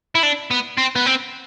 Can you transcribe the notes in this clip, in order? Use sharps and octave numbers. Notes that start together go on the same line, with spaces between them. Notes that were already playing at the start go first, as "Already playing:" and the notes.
E4
D4
B3
C4
B3
C4